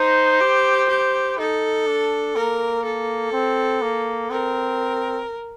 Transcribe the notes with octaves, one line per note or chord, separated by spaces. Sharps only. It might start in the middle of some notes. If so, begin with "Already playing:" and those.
Already playing: D#4 C5
G4
G4
D#4 A4
D4
A#3 A#4
A4
C4
A#3
C4 A#4